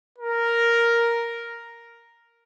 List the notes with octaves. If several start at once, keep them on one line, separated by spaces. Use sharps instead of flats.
A#4